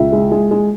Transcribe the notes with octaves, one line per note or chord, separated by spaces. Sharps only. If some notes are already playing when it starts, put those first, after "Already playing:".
Already playing: C#2 E5
G#3
G#3
G#3